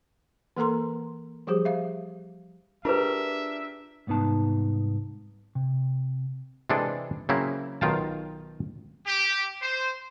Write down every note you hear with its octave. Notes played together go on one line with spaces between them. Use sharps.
E3 A#3 A4 A#4 A#5 C6
F3 G3 G4 G#4 C5
E5 F5
D4 F4 G4 G#4 A#4 B4 E5
C2 G#2 B3 D#4 A5
C3
C3 E3 G#3 D4 G#4 A4
C#3 F#3 A#3 C4 E4
B1 D#3 F4 F5 G5 A5
G4
C5